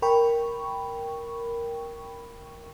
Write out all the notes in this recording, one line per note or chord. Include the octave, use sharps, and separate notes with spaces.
A#4 G5 B5 C#6